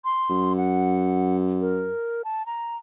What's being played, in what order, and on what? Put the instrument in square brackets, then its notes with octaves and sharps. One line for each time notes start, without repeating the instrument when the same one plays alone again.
[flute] C6
[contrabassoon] F#2
[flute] F#5
A#4
A5
A#5